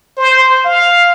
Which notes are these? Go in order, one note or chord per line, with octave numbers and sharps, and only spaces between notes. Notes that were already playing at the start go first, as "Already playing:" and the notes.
C5
F5